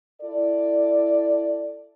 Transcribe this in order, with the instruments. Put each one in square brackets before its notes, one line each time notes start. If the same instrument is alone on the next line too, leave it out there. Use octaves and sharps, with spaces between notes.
[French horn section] E4 A4 D5